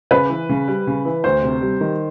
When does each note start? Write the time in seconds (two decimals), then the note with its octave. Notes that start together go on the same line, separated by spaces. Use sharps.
0.11 C#3 B4
0.30 E3
0.49 C#3
0.68 G3
0.87 C#3
1.05 E3
1.24 D2 C5
1.43 C3
1.61 G3
1.81 D#3